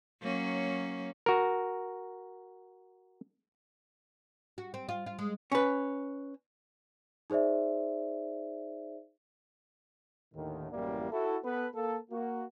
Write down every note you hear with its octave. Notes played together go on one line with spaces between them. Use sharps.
F#3 A#3 C#4
F#4 A#4
F#4
C4
F4
F4
G#3
C#4 B4
D#4 G#4 C5 D5 E5
D#2 A2 D3 D#3
A1 F#2 G3 A#3 E4 D5
E4 F#4 A4
B3 A4 B4
A#3 A4
A#3 F#4